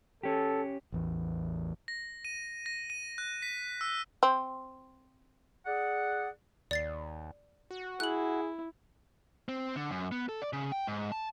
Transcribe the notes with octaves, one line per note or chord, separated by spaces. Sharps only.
C#4 G4 A4
A1 E2 E3
A#6
D#7
A#6
D#7
F#6
B6
E6
C4
G#4 D5 F#5
D#2 D5 A6 C7
F#4
E4 G#4 F#6 F#7
C4
D3
F#2
B3
A4
D5
C#3
G5
G#2
A5